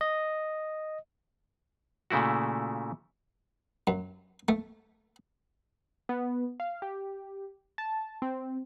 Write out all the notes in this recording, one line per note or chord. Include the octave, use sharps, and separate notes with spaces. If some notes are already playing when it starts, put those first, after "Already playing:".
D#5
A#2 C#3 A3 E4 F#4
F#2
A3
B3
F5
G4
A5
C4